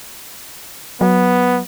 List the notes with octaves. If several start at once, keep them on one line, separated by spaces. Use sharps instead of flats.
F#3 B3